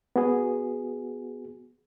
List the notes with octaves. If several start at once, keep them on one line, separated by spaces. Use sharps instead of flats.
B3 F#4 G#4